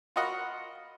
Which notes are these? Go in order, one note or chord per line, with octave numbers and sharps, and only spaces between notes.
F4 F#4 A#4 D#5 F#5 B5